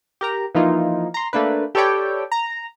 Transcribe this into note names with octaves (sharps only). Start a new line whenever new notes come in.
G4 A#4 A#5
E3 F3 A#3 D#4 F4
A#5 C6
A3 A#3 D4 B4
G4 A4 B4 C#5 D5 G5
A#5